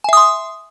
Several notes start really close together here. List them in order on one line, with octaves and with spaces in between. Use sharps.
G#5 E5 D#6 C6